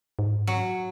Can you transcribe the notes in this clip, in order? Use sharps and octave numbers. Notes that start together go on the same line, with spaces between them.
G#2
F#3